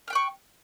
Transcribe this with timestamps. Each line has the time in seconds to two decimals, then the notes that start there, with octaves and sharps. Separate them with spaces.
0.08 F6
0.10 G5
0.13 F#6
0.15 C#6